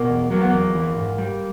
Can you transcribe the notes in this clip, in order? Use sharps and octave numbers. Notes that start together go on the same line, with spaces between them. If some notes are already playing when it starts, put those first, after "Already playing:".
Already playing: B2 A#3
E2
F#3 A#3
B3
E2 A#3
E3
G#2
G3